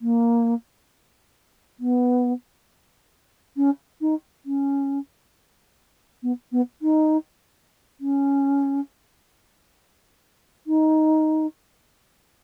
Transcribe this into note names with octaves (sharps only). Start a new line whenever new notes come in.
A#3
B3
C#4
D#4
C#4
B3
B3
D#4
C#4
D#4